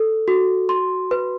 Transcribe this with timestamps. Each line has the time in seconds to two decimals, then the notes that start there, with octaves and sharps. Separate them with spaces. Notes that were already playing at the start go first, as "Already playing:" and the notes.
Already playing: A4
0.28 F#4
0.69 C6
1.11 B4